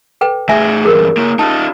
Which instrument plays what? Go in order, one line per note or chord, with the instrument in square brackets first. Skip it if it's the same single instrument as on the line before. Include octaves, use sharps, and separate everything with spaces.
[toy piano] A4 B4 G5
[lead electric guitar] A2 G#4 [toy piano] E5 G#5
[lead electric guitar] E2 G2 [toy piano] G#4 A#4
[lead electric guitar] A#3 E4
[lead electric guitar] D#4 F4 [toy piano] A5